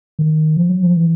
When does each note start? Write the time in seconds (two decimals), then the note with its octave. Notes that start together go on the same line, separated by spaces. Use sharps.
0.19 D#3
0.57 F3
0.70 F#3
0.83 F3
0.97 E3